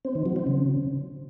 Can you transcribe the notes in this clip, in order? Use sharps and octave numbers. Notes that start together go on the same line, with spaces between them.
C4
D#3
F#3
C4
C#3